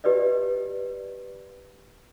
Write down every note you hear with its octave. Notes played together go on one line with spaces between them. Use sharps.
G4 B4 D5 D#5